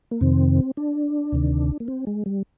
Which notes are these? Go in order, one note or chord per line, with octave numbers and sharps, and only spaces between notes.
A#3
F2 C3 D#3 C4
D4
D2 C3 D#3
A#3
C4
G#3
G3